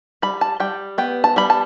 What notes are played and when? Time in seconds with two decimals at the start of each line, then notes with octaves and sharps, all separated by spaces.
0.22 G3 B5
0.41 A5
0.60 G3 G5
0.98 B3 G5
1.24 A5
1.36 G3 B5
1.50 A5